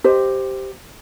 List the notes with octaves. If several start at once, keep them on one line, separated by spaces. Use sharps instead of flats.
G4 C5 D#5